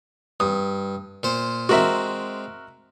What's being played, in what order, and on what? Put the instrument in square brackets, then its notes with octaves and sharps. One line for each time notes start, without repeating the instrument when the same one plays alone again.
[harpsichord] G2 [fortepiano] D#6
[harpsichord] A#2 C5
[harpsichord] G#3 C4 [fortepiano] F#4 A#4 E5